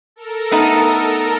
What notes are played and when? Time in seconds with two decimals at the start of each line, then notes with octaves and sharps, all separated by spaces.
0.16 A4 A#4
0.51 A3 B3 D#4